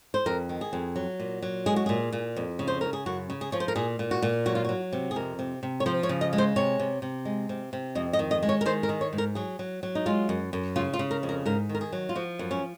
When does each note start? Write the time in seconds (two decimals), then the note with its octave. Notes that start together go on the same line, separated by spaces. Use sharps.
0.14 C5
0.26 F2 A#4
0.49 D#3
0.61 G#4
0.73 F2
0.96 F#3
1.19 A#2
1.42 F#3
1.66 G#3 G#4
1.76 F#4
1.86 A#2 G#4
2.12 A#2
2.36 F2
2.59 C#3
2.67 C5
2.81 C#3 A#4
2.93 G#4
3.06 F#2 F#4
3.30 C#3
3.41 G#4
3.52 F3 C#5
3.60 C5
3.68 A#4
3.75 A#2 G#4
3.99 A#2
4.11 F#4
4.22 A#2
4.46 F#3 F#4
4.55 F4
4.65 F#3 F#4
4.93 C3
5.11 G#4
5.16 F2 A#4
5.39 C3
5.63 C3
5.80 C#5
5.86 F3 C5
6.03 C#5
6.09 C#3
6.21 D#5
6.33 G#3
6.38 C5
6.56 C3 C#5
6.79 C3
7.02 C3
7.25 G#3
7.49 C3
7.73 C3
7.95 F2 D#5
8.13 D#5
8.19 D#3
8.31 D#5
8.43 G#3
8.49 C#5
8.61 A#4
8.66 D#3 C5
8.83 A#4
8.89 D#3
9.01 C#5
9.13 G#2
9.18 A#4
9.35 F#3 G#4
9.59 F#3
9.83 F#3
9.95 D#4
10.06 G#3 F4
10.29 F#2
10.53 F#2
10.76 C#3 F4
10.93 F4
10.99 C#3
11.11 A#4
11.23 F2
11.29 A#4
11.46 G#2 A#4
11.69 D#3
11.75 A#4
11.81 G#4
11.92 F#3
12.09 F4
12.15 F3 F#4
12.39 F#2
12.51 C#4